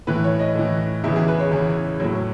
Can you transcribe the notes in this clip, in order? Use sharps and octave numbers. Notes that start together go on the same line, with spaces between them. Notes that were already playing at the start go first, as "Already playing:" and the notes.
A2 E3 B4
C#5
D#5
A2 E3
E2 C#3 E3 E4
G#4
B4
C#5
E2 C#3 E3
A2 F#3